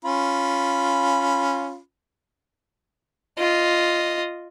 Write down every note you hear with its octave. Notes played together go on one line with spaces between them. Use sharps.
C#4 F4 B5
F4 D#5